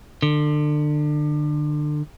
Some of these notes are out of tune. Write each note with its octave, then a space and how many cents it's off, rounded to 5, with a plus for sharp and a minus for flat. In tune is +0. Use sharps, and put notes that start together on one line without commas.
D3 +30